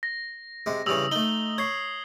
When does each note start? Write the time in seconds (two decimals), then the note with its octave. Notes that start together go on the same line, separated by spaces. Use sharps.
0.03 A#6
0.66 C3 G#3
0.86 G2 C#3 E3 D#6 E6 F#7
1.12 A3 D#4 G7
1.58 C#5 G#6 C7